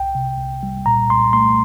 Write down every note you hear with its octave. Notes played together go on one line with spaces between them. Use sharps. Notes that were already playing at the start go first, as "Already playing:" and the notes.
Already playing: C2 G5
C3
C2
G3
A#2 A#5
C2 C6
A3 C6